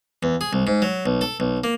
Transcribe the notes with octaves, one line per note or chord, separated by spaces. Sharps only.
E2
G#4
C2
G#2
F#3
B1
A4
B1
A#3